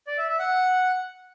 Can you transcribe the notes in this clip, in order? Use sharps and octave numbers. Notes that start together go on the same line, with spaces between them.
D5
E5
E5
F#5